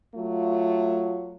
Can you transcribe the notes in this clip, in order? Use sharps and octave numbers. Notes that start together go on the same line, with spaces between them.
F#3 A3 F4